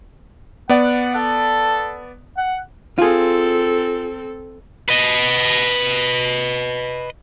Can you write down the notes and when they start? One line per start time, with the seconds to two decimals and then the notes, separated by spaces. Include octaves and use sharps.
0.69 B3 D5 F#5
1.15 A4
2.38 F#5
2.98 C4 F4 G#4 A4
4.89 B4 D#5